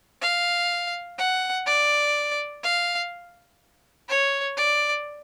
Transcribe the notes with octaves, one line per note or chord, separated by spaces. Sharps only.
F5
F#5
D5
F5
C#5
D5